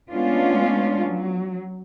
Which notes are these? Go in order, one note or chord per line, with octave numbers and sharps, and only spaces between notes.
G#3 A3 B3 C#4 D4 F4
F#3